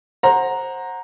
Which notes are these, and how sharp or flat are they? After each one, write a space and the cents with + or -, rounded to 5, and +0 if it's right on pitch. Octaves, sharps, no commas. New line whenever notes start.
C5 +20 F#5 -10 A#5 +0